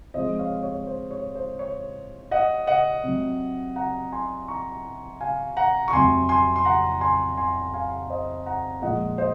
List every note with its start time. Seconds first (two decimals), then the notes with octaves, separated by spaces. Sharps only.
0.14 C3 F3 G#3 C5 D#5
0.39 C#5 F5
0.63 C#5
0.87 C5
1.11 C#5
1.36 C5
1.59 C#5
2.31 D#5 F#5
2.67 D#5 F#5
3.03 C3 F#3
3.76 F#5 A#5
4.12 G#5 C6
4.48 A#5 C#6
5.20 F5 G#5
5.57 F#5 A#5
5.88 C#6
5.93 F2 C3 F#3 G#5 C6
6.29 G#5 C6
6.56 C6
6.65 F#5 A#5
7.01 G#5 C6
7.37 G#5 C6
7.74 F5 G#5
8.10 C5 D#5
8.46 F#5 A#5
8.82 A#2 F3 G#3 D#5 F#5
9.18 C5 D#5